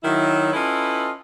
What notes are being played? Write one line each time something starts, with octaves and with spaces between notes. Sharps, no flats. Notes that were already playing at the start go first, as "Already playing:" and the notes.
D#3 F#3 E4
C#4 E4 F4 A4 B4 D#5